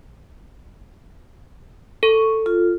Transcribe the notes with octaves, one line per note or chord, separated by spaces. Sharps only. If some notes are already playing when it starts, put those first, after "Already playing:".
A4 C#6
F4